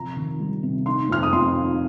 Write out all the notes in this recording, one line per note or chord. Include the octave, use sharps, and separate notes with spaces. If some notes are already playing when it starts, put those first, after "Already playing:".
Already playing: C3 F3 A#5
D#3
G3
C3
D#4 C6
F2 F6
D#6
F2 C6
D#4